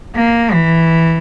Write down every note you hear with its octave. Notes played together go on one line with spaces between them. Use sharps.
A#3
E3